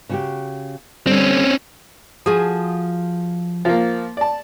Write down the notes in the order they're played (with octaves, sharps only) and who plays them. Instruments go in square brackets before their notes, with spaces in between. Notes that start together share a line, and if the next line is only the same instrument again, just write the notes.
[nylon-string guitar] C#3 F#4 G4
[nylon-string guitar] D3 G3 [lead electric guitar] C4 C#4
[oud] F3 F#4 G#4 [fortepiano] D#6
[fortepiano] F3 A#3
D5 A5